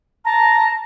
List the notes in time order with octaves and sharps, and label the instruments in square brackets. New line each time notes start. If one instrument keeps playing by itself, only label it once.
[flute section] A5 A#5